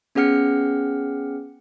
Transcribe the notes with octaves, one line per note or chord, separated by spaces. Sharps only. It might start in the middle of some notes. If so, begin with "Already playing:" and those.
B3 C#4 G#4 F#5 F6 C#7